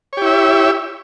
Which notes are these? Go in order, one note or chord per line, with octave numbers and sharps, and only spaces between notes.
E4 G4 C#5 E5